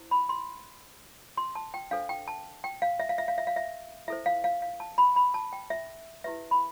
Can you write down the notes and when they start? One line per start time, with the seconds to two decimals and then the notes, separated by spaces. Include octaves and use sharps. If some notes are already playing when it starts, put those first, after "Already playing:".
Already playing: E4 C5
0.11 B5
0.29 C6
1.37 C6
1.55 A5
1.74 G5
1.91 D4 A4 C5 F5
2.09 G5
2.28 A5
2.64 G5
2.82 F5
3.00 E5
3.09 F5
3.18 E5
3.28 F5
3.38 E5
3.47 F5
3.56 E5
4.08 E4 A4 C5 E5
4.26 F5
4.44 F5
4.62 F5
4.80 A5
4.98 B5
5.16 B5
5.34 A5
5.53 G5
5.70 E5
6.24 E4 G4 B4 E5
6.51 B5